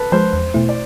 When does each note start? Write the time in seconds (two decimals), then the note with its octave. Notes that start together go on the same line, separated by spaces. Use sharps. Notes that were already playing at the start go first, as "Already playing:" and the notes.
Already playing: A4 B4
0.12 F3 G#3 C5
0.33 E2
0.54 B2 A3 E4
0.69 D5